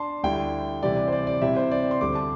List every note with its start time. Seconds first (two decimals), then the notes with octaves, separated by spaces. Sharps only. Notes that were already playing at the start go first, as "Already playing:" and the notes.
Already playing: D4 A5 C6
0.23 D2 D3 G3 E4 G5
0.82 C3 E3 G3 E4 D5
1.08 C5
1.12 D5
1.27 D5
1.42 C3 G3 C4 E4 E5
1.56 C5
1.71 D5
1.91 C6
2.01 D2 D3 G3 D6
2.15 A5